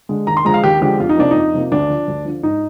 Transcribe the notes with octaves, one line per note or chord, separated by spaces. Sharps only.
D3 G#3
D#2 A#5
C6
D3 F3 G#3 A#5
F5
D#2 G4
D3 F3 G#3 G4
F2 F4
D#4
C3 F3 A#3 D4
F2 D#4
C3 F3 A#3
D2 D4
D3 F3
D2
D3 F3
G#2 D#4